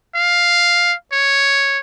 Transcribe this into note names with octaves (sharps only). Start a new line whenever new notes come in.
F5
C#5